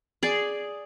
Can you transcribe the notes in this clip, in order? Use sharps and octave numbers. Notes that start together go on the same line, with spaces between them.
G#4 D5